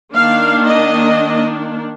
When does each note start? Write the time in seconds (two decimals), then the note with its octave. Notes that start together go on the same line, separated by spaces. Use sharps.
0.13 D#3 A#3 D4 F5
0.66 D#5